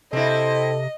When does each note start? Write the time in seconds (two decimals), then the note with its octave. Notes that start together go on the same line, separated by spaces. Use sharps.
0.13 C3 C4 E4 A4 D#5